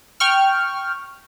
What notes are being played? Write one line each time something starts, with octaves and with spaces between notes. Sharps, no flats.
G5 C#6 F6